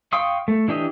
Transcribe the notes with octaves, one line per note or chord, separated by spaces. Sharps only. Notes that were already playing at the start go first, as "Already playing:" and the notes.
F5 G5 C6 C#6 D#6
A3
E3 D4 G4 D#5